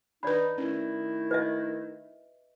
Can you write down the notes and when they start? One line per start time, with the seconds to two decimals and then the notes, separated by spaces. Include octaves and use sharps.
0.23 D4 D#4 B4 D5 B5
0.58 D#3 A3 C#4 E4
1.31 B4 D#5 E5